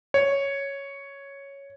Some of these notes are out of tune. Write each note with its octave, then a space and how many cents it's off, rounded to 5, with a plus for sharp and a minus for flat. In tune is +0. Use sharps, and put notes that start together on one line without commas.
C#5 +0